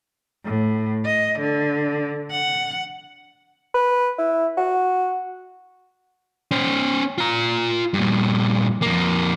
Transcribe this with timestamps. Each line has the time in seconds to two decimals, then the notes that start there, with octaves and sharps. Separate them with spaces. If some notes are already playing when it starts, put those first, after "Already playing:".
0.44 A2
1.05 D#5
1.39 D3
2.31 F#5
3.74 B4
4.18 E4
4.58 F#4
6.51 C#4 C5
7.18 F4 A#5
7.94 G2 A#2
8.82 F2 A#3